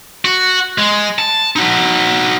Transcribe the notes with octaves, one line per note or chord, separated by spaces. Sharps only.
F#4
G#3
A5
D#4 F#4